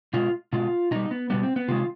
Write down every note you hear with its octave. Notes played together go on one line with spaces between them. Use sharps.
B2 G#3 F4
B2 G#3 F4
B2 G3 D#4
B3
B2 G3 B3
C4
B3
C3 D#3 G#3 F4